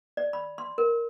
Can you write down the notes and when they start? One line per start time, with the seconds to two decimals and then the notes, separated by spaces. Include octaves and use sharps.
0.17 D5
0.33 B5
0.58 C6
0.78 A#4